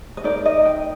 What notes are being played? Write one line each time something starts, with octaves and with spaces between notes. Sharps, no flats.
D#5
D#4 A#4 D5
D#5
G5